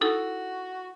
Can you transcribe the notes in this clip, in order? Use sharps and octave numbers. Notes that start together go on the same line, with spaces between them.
D#4 E4 F#4 A4